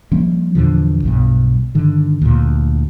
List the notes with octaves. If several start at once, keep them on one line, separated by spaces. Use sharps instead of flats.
F3 G3 A#3 C#4
E2 A#2 D3 F3
B1 G2 B2
G2 D3 D#3
D2 A#2